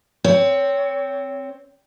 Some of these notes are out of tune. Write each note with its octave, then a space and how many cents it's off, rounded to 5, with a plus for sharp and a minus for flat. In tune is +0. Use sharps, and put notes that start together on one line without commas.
C4 +5 C#5 +20